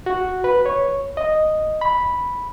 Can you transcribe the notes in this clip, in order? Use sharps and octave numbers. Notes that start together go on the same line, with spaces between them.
F#4
B4
C#5
D#5
B5